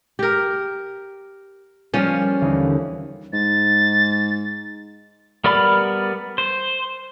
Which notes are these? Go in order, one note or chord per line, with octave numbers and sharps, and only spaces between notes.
G4 A#4
F3 G3 A#3 C#4
D#2 D3 E3
G#2 A6
G3 B3 A#4 D5 B5
C5